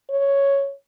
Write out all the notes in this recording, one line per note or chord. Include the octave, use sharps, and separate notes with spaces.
C#5